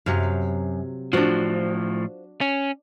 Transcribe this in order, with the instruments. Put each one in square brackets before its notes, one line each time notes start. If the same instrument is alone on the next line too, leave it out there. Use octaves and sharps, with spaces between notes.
[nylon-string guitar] F#2 [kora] C3 F#3 F5
[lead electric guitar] A2 F3 [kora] D4 F#4 [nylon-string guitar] F4 C5
[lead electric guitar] C#4